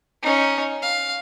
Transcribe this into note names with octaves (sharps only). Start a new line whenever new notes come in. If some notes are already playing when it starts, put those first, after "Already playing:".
C#4 D#4
F5